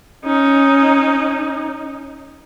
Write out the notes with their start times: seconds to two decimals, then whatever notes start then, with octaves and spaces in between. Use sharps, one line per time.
0.25 C#4 D#4